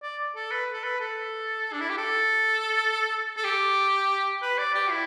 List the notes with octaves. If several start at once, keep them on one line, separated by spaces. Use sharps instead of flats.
D5
A4
B4
A4
B4
A4
D4
E4
G4
A4
A4
G4
B4
D5
G4
E4